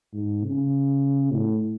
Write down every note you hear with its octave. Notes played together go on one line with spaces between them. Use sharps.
G#2
C#3
A2